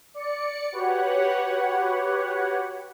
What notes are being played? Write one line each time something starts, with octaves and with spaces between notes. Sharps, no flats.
D5 C#7
F#4 G4 B4 C#5 F#5